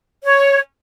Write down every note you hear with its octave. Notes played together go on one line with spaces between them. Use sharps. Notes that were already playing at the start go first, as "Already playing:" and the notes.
C#5